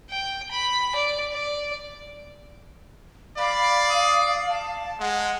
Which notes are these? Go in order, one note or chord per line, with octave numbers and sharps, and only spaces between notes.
G5
B5
D5
D5
D5 F5 B5
D#6
A5
G#3 F#5